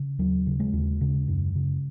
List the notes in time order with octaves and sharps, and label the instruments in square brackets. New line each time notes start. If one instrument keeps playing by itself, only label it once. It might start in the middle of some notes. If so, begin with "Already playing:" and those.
Already playing: [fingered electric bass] C#3
D#2 F#3
C#3
G#3
D#2
C#3
F#2
C#3